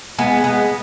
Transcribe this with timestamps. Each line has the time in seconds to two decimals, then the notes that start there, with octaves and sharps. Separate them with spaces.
0.18 G#3 B3
0.44 G#3 B3